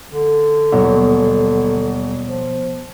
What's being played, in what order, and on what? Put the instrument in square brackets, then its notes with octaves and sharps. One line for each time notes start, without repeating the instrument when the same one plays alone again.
[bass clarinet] D3
[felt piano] D#1 F#3 [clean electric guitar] B2
[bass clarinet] F3